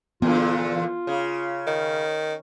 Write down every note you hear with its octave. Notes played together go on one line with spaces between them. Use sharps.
E2 A#2 D3 B3 F4
C#3
D#3